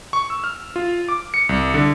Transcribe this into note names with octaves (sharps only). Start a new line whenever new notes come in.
C#6
E6
F6
F4
D6
C#7
C2
D3